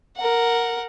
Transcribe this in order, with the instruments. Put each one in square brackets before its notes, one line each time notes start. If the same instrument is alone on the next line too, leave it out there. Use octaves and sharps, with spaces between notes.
[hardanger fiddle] A#4 F#5